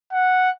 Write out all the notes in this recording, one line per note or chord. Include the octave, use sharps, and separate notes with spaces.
F#5